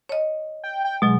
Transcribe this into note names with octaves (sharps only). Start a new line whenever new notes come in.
C#5 D#5
G5
G5
B2 F#3 G#3